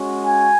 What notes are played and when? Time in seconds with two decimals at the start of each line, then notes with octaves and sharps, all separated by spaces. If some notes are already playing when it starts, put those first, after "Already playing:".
Already playing: G#3 C#4 F#4
0.27 G#5